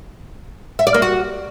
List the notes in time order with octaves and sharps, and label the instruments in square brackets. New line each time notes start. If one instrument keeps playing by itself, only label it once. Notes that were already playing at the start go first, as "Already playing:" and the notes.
[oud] E5
D5
A#3
F#4